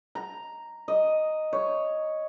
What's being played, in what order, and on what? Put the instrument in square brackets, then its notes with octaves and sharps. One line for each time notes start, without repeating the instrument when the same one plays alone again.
[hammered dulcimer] A#5
D#5
C#5